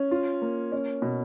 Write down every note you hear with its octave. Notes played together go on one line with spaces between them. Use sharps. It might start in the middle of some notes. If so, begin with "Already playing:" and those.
Already playing: C#4
F4
A#3
C#4
B2